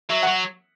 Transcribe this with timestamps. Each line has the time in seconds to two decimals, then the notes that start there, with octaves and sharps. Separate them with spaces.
0.10 F#3 E5
0.23 F#3 F#5